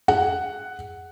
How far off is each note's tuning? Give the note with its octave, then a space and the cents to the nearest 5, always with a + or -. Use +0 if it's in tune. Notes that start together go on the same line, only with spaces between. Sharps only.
G#4 +0 F#5 +5